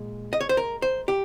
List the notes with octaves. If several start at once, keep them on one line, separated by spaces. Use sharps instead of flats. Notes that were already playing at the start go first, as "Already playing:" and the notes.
Already playing: A#2 G#3
D#5
C#5
C5
A#4
C5
G4